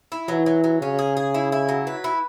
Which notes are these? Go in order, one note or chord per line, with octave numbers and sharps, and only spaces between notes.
E4
E3 F#3
F#3
F#3
C#3 C#4
G#4
G#4
E4
E4
F#3
B4
E4